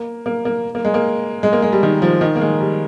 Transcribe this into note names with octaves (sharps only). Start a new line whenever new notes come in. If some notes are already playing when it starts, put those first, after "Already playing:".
Already playing: A#3
A#3
A#3
A#3
G#3
A#3
G#3
A#3
G#3
G3
D#3
F3
D#3
A#3
G#3
G3